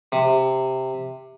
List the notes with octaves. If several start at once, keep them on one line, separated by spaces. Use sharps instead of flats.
C3